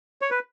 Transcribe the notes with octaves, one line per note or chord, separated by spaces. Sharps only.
C#5
B4